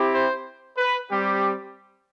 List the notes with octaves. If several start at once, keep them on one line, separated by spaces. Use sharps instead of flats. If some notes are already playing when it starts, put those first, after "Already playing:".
Already playing: C4 E4 G4
C5
B4
G3 C4 G4